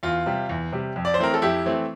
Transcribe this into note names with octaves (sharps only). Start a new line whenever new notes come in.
E2 F4
C3 G3
E2
C3 G3
F2
D5
C5
E3 A3 C4 A#4
A4
F2 E4 G4
E3 A3 C4